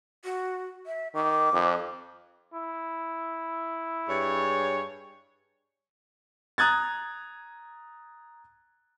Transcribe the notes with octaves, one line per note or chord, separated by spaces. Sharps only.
F#4
E5
D#3 D6
F2
E4
G2 G#4 C#5
A#5 D#6 F#6 G#6 A6